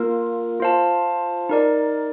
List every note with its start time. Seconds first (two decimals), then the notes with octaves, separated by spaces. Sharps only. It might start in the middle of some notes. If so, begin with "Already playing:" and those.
Already playing: A#3 F4 A#4
0.60 F4 C5 F5 A5
1.49 D#4 A#4 D5